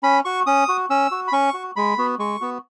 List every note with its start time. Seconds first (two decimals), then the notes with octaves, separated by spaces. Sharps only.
0.03 C#4 B5
0.25 F#4 C#6
0.47 C#4 D#6
0.68 F#4
0.90 C#4 E6
1.11 F#4
1.28 B5
1.32 C#4 C#6
1.54 F#4
1.76 G#3 B5
1.98 B3 F#4
2.19 G#3 C#6
2.41 B3 F#4